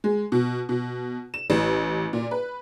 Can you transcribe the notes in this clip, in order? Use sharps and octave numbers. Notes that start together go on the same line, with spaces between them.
G#3
B2
B2
E7
A1
A#2
B4